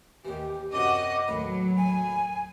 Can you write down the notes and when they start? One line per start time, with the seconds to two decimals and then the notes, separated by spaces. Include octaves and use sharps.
0.25 D#2 E3 G4
0.72 F#2 C3 F#4 D#5 D6
1.28 D#2 A2 F#3 B4 B5
1.77 G#5